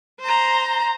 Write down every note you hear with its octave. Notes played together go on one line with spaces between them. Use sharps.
C5 A#5